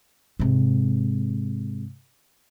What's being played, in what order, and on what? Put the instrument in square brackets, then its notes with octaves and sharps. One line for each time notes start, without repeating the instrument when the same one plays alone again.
[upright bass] G#2 C3